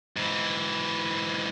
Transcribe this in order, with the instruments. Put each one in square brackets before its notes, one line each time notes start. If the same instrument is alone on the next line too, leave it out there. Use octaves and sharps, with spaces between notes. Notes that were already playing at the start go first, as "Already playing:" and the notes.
[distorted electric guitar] G#2 E3